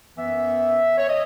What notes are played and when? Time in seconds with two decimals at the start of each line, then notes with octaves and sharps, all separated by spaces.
0.17 F#2 E3 B3 E5
0.97 C#5
1.08 D#5